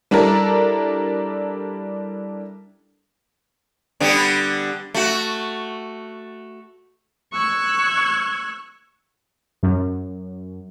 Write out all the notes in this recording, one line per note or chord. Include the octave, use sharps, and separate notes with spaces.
G3 D4 E4 A4 A#4
D3 G3 B3
A3 F#4
C#6 E6 F#6 G#6
F#2